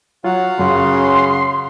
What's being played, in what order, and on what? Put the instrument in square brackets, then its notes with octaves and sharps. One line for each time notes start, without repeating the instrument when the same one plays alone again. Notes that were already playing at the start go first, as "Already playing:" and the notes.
[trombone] F#3 [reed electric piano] F4 [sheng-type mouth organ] F#4 F5 F#5
[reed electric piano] F#2 [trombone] C#3 [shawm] C6